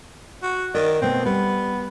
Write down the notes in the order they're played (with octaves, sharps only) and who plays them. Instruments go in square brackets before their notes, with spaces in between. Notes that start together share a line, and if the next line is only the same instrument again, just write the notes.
[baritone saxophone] F#4
[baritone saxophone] D#3 [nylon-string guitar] D5
[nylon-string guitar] B2 A3 [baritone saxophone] C4
[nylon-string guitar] G3 [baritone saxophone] B3